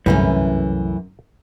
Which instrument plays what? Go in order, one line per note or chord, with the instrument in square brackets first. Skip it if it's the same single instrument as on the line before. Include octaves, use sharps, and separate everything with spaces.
[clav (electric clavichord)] G1 A2 [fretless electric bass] C2 [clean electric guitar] F#2 [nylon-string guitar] E3 A3 C#4